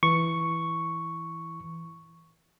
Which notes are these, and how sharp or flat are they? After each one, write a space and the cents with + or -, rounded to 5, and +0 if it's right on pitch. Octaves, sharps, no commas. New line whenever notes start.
E3 +0 C#6 +0